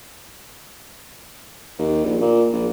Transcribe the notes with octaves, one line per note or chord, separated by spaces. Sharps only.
D#2
A#1
A#2
A#1